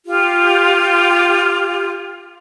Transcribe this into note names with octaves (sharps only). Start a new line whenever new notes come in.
F4 G4